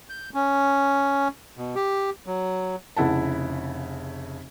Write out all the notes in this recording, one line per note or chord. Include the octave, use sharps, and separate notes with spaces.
G6
C#4
B2
G4
F#3
F1 C#3 E4 F#5 A5